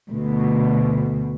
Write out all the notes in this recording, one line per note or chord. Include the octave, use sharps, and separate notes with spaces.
D2 B2